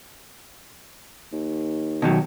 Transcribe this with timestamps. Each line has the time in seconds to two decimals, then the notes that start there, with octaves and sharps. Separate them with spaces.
1.33 D#2
2.02 B2 D#3 F#3